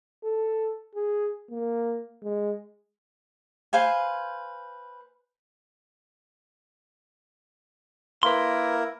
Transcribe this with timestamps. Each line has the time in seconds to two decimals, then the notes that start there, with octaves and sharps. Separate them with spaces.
0.24 A4
0.95 G#4
1.51 A#3
2.23 G#3
3.73 B4 C5 F5 G#5
8.23 A#3 E4 A#4 B4 C6